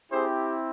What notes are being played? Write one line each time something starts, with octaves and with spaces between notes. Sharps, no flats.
C4 E4 G4 G#4 C5